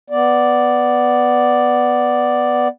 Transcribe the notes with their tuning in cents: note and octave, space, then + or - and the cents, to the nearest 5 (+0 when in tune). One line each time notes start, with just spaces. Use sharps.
B3 +0 D5 +0